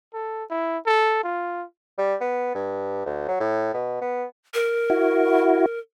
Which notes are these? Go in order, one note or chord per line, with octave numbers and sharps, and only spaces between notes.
A4
E4
A4
F4
G3
B3
G2
D2
F#3
A2
B2
B3
A#4
E4 F#4